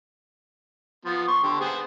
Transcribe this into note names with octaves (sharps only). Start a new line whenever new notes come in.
F3 B3
C6 C#6
D3 G4
B3 G#4 C5